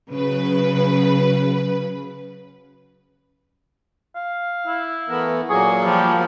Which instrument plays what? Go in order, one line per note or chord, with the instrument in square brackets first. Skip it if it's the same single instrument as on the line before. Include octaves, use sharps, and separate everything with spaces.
[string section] C#3 F#3 B4
[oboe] F5
[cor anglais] E4
[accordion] E3 A3 B3 [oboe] A#4
[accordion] A#2 F#3 A#3 [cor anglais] G#4 [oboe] C#6
[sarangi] F3 [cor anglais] G3